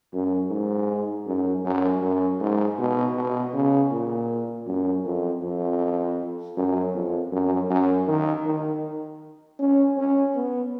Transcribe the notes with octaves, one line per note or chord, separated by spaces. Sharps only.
F#2
G#2
F#2
F#2
F#2
G#2
B2
B2
C#3
A#2
F#2
F2
F2
F#2
F2
F#2
F#2
D#3
D#3
C#4
C#4
B3